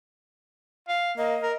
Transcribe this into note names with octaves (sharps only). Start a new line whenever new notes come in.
F5
A#3 D#5
A#4